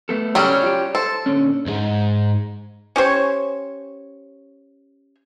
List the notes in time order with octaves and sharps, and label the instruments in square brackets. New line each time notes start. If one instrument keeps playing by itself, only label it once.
[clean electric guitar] A3 B3 A4
[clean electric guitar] C#3 G4 A4 [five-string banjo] F#3 G3 C#4
[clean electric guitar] F4 G4
[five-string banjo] A4 [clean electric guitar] C5
[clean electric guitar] A#2 D3 C#4
[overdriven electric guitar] C2 G#2
[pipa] C#4 G4 C5 C#5